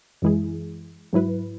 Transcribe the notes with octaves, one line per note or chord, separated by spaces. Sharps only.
F#2 E3 G#3 E4 G#4
G#2 F#3 E4 B4